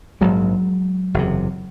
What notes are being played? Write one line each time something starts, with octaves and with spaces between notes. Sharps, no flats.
A#1 G#2 F#3 G#3
F#1 E2 C3